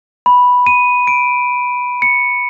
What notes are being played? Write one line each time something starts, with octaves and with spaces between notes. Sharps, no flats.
B5
D#7
D7
C#7